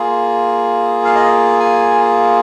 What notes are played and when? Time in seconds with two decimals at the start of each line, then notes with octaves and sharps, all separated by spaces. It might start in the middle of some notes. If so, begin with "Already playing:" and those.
Already playing: A#3 F4 G#4
1.05 F5
1.15 D#5
1.60 G#5